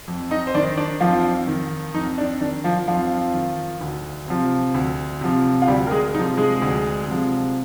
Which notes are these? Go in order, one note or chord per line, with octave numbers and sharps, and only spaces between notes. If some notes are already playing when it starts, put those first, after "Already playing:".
F2
D#4 D#5
C5
D#3 D4 D5
D4 D5
F2 F3 F4
D#3
F2 D#4
D4
D#3 D4
F3 F4
F2 F3 F4
D#3
D2
C3 F3
D2
C3 F3
F4
D2 G3 G4
A#4
G#3 G#4
C3 F3 D#4
G#3 G#4
D2
C3 F3